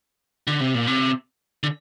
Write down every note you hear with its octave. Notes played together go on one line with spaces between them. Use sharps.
D3
C3
A#2
C3
D3